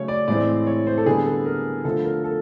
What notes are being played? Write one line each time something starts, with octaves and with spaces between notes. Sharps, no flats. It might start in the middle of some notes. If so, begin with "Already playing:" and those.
Already playing: C#3 F#3 A3 C#4 C#5
D5
A2 E3 G#3 C4 D5
C#5
C5
A4
D3 G3 B3 G#4
A4
A#4
D3 F3 A3 A4
A#4
A4